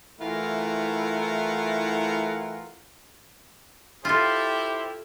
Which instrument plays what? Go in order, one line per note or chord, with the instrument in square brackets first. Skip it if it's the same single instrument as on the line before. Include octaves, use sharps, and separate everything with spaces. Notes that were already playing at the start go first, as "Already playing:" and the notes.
[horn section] E3 A3 E4 F4 A#4 F#5
[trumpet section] E4 G4 C5 [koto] F4 A4